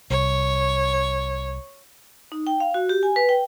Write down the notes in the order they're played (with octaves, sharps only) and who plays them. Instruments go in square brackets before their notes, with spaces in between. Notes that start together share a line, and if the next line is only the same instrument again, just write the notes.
[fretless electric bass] C2 [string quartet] C#5
[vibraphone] D#4
G5
F5
F#4
G4
G#5
B4
G5